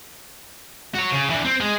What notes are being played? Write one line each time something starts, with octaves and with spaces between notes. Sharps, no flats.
F#4 C#5
C#3
E3 D4
C4
G#3